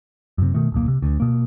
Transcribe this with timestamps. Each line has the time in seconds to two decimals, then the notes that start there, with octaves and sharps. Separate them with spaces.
0.38 F#2 C3
0.54 B2 D#3 A3
0.72 D1 B1 A#3
0.88 C3
1.02 D2
1.20 B2 A#3